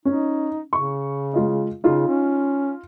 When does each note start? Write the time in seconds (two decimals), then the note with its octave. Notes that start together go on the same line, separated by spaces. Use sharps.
0.05 C#4 D#4
0.73 C#3 C#6
1.33 G#3 F4 D#5
1.84 C#3 D#4 F4
2.08 C#4